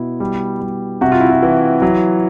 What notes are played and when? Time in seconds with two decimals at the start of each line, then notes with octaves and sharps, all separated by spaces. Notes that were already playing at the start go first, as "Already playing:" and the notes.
Already playing: B2 E4
0.20 G3
0.61 G3
1.01 C3 F#4
1.12 F4
1.21 E4
1.31 F4
1.43 E3
1.82 F#3